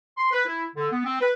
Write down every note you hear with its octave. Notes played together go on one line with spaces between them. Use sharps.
C6
B4
E4
D3
B3
C4
B4